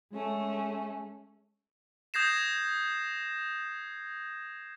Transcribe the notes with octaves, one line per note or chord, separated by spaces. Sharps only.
G#3 A3 C#4
D#6 G6 G#6 A#6 C7 E7